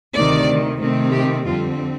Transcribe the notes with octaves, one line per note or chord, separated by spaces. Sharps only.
D2 C3 D#3 D5
C3 D#3 A3 C4
G4
F2 D3 G3 C4 F4